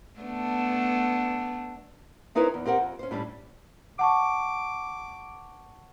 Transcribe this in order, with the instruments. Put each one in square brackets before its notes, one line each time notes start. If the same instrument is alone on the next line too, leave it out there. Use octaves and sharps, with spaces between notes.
[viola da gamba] A3 B3 D4
[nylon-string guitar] C4 D#4 E4 A#4 B4 C#5
E2
C4 G4 A#4 F#5
F2
C#4 C5
A2 G3 C#4 D4
[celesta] F#5 A5 C#6 [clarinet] D6